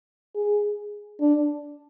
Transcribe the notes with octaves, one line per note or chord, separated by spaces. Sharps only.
G#4
D4